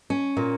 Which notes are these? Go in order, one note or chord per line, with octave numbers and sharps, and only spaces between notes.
C#4
A#2 A#3